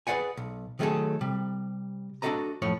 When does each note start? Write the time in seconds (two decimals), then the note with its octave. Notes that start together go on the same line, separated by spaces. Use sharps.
0.07 G#4 B4 C#5 D5 F#5 G#5
0.37 B1
0.79 D#3 F#3 A3 C#4 G#4 A4
1.21 C3 G3
2.22 D4 F#4 G4 A4 D#5 A#5
2.62 F#2 A2 F3 C#5